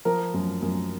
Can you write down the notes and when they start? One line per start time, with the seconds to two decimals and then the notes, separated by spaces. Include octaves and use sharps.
0.05 F3 A#4
0.34 F#2
0.62 F#2